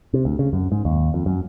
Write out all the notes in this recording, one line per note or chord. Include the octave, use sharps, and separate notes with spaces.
C3
D2
C#3
F#2
G#2
D#2
F2
F#2